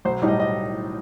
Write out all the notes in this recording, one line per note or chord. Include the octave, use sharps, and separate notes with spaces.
B1 C5
A2 G3 D#4
D#5
D#5